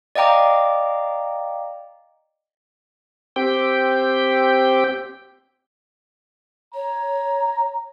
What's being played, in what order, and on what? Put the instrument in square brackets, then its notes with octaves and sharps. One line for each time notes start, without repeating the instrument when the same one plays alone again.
[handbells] D5 D#5 F5 G5 A#5 D6
[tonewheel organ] C4 G4 G5
[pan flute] C#5 [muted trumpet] A#5